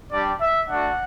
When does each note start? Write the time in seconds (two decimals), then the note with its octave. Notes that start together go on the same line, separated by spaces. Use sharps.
0.11 G3 D4 G4 D5
0.41 E5
0.68 A3 D4 F#4 F#5